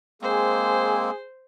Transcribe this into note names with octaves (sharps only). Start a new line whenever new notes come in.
G#3 A#3 C4 G#4 C5